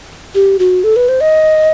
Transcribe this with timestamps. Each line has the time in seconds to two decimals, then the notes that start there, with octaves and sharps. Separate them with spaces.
0.35 G4
0.59 F#4
0.84 A4
0.96 B4
1.09 C5
1.21 D#5